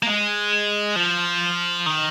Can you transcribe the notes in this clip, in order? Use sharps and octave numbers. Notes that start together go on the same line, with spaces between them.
A#3
G#3
F3
D#3